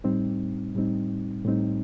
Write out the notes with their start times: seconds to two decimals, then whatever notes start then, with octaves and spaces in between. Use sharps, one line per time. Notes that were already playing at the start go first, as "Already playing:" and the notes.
0.04 A2 G3 C4 D#4
0.75 A2 G3 C4 D#4
1.45 A2 G3 C4 D#4